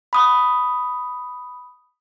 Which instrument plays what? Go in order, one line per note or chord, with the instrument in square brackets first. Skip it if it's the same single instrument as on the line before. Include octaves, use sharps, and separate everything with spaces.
[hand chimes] B5 D#6